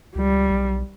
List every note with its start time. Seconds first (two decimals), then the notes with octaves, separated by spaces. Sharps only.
0.15 C#2 G3
0.51 B1